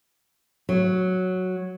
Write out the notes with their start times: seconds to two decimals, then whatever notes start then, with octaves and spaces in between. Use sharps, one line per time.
0.69 F#3